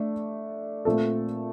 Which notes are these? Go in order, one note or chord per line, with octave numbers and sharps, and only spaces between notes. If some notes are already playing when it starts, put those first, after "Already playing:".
Already playing: A3 D4 A4
A#2 A3 C4 F4 A4